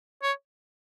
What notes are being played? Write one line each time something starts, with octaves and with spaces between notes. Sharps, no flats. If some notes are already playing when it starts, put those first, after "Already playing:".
C#5